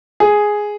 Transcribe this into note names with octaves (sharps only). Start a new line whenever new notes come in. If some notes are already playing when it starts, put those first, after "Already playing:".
G#4